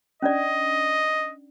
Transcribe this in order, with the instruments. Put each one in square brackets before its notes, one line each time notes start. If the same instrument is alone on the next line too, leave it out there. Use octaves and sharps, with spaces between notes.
[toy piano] C#4 D4 D5 [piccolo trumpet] D#5